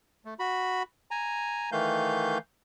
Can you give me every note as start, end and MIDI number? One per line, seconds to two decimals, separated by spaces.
0.25 0.34 57
0.39 0.83 66
0.39 0.83 83
1.11 1.70 80
1.11 1.70 82
1.72 2.38 51
1.72 2.38 52
1.72 2.38 57
1.72 2.38 77
1.72 2.38 91